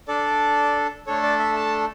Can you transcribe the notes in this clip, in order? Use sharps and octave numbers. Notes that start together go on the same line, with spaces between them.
D4 A4 D5
A3 D4 A4 C#5
D5
E5
A5